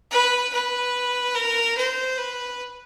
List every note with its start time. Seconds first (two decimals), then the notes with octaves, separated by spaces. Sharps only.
0.11 B4
0.53 B4
1.36 A#4
1.77 C5
2.18 B4